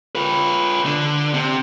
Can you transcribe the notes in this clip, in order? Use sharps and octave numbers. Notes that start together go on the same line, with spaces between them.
F4 B4
D3
C3